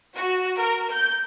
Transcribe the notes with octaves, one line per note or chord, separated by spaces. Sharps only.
F#4
A#4
G6